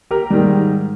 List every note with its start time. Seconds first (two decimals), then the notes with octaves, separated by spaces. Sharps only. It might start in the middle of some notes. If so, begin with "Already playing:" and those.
0.11 G4 A#4
0.31 G#2 D#3 G3